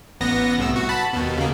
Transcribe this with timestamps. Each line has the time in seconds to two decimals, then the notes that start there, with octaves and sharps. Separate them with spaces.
0.21 A1 B3 A#6
0.59 C2 A2 E6
0.76 F#4
0.89 A5 B5
1.13 D#2 B2
1.37 C#3 A#3